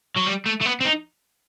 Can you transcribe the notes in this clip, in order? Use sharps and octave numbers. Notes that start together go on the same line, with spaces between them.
F#3
G3
A3
A3
B3
C4
D#4